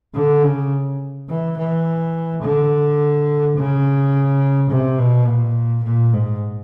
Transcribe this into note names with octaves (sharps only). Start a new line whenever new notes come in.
D3
C#3
E3
E3
D3
C#3
C3
B2
A#2
A#2
G#2